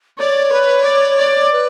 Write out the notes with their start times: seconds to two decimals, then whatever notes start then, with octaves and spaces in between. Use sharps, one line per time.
0.19 C#5 D5
0.52 B4
0.86 D5
1.18 D5
1.52 B4